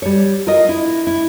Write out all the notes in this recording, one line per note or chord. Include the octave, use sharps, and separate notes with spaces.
G3 C#5
F4 A#4 D#5
E4
E4